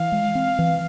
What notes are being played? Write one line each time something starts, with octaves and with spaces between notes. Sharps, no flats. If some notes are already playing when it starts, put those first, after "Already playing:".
Already playing: E3 F5
G#3
C4
E3